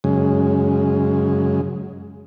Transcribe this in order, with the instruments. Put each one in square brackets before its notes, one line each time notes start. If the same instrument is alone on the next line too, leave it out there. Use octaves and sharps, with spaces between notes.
[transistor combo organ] F#2 C#3 G#3